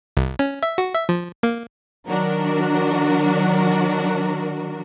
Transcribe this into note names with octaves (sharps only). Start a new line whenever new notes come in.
C2
C#4
E5
F#4
E5
F3
A#3
D#3 F#3 D4 F#4 A#4